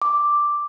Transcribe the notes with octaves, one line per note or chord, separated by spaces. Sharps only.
D6